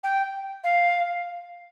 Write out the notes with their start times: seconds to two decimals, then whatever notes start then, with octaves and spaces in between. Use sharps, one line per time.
0.03 G5
0.64 F5